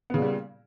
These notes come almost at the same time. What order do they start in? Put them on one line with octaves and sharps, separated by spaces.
B3 C#3 A#2 G3